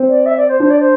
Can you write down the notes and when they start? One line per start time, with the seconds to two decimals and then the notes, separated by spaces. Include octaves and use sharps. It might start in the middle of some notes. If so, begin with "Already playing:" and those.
Already playing: C4
0.09 D5
0.26 E5
0.37 D5
0.48 C5
0.60 D4 C5
0.70 D5
0.80 C5